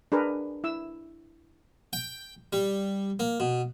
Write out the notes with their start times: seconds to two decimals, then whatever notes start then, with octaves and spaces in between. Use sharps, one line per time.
0.12 D4 G#4 A#4 B4
0.64 E4 E6
1.93 G5
2.53 G3
3.20 A#3
3.40 B2